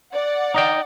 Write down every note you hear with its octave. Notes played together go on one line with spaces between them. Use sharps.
D5 F#5
D#4 D#5 G5